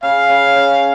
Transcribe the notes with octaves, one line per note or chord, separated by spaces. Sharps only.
C#3 F5
C#3
C#3